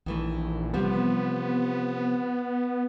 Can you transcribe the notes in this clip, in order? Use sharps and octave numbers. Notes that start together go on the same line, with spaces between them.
A#1 D#3 E3 A3
C3 F3 G3 B3